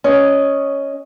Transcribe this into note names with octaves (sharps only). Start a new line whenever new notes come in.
C#4 D#5